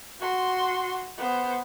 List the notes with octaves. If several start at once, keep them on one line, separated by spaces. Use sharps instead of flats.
F#4 C6
B3 C5